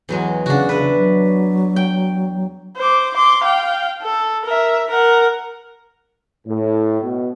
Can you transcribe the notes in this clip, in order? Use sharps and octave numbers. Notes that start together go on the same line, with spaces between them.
E2 F#3 G#3
C#3 D4 F#4
B4 E5
F#3
G5
C5 D6
C6 D6
F5 G5
A4
A#4 E5
A#4 F#5
A2
B2